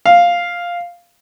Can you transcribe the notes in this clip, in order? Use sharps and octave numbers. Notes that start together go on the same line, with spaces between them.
F5